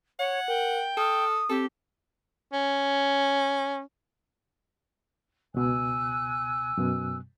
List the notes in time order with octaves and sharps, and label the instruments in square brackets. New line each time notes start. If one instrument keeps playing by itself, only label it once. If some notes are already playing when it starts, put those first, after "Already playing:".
[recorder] C#5 [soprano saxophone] F#5 [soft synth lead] G#6
[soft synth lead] A#4 [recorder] G5
[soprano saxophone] A4 [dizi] D#6 [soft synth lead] F6
[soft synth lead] C4 [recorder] G4 [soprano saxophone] A4
[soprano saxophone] C#4
[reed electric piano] C#2 B2 [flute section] G#5 E6 F#6
[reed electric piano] F#2 B2